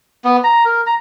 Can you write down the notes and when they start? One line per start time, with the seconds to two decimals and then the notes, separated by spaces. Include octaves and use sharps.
0.25 B3
0.44 A#5
0.65 A#4
0.87 A#5